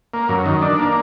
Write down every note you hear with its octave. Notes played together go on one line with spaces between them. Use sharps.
A#3
F#2
D#3
D4
A#3